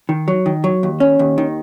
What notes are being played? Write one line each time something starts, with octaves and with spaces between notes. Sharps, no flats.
D#3
F#3
D#3
F#3
D#2
C#4
D#2
D#3